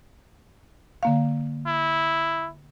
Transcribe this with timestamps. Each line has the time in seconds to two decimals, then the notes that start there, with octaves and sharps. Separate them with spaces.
1.03 D3 A#3 F5
1.66 E4